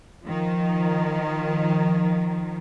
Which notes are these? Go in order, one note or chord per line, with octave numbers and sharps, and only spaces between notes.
D#3 F3